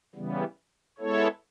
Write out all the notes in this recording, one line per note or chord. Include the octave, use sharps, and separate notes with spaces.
C#3 E3 G3 B3
G#3 B3 E4 A4 C#5